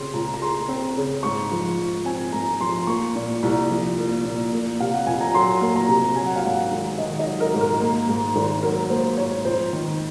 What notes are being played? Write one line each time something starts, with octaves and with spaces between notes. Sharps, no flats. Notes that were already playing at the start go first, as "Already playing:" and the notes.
Already playing: C#3 C4 C6
C#2 A#5
A#5
G#3 C6
C4
C#3
G#2 C#6
F3
G#2
C4 G#5
G#2 A#5
F3 C6
A#3 C#6
A#2
C2
F3
A#3
A#2
A#3
C3 F5
F#5
F2 G#5
A#5
F#3 C6
A#3
A#5
C3
F#3 G#5
F#5
F5
G#2 F#5
G#1
D#3 D#5
D#5
F#3
A#4
G#2
A#4
A#3
G#2
G#1
F#3 A#4
A#3 C5
G#2 C#5
F2 C5
D#3